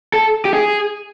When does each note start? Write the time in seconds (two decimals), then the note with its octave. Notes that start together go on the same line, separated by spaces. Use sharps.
0.14 A4
0.45 G4
0.54 G#4